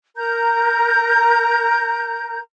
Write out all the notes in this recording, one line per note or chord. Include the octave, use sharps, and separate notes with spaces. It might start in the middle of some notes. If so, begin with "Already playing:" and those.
A#4 A#5 G6